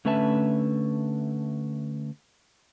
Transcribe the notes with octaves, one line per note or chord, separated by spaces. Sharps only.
D3 A3 C#4 B4 E5 A5